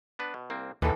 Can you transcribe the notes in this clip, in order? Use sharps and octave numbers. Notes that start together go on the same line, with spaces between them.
B3 D4 B4
B2
C2 A#3 C4
D#2 D3 E3 B3 A4